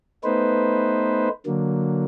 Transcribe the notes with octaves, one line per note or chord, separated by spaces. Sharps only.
A3 B3 D#4 B4 C5
D3 F#3 A#3